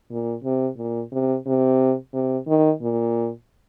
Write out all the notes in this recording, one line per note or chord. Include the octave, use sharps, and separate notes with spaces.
A#2
C3
A#2
C3
C3
C3
D#3
A#2